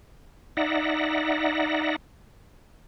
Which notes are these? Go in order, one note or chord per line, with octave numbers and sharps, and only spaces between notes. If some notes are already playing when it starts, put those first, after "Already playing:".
D#4 D5 E5 F#5 A#6